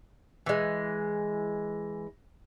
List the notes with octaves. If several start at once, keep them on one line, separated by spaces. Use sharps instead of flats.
E3 G#3